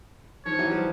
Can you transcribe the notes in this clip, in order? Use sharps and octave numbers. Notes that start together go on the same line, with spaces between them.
D#3 F3 C#5
E3 F#3
F3 G3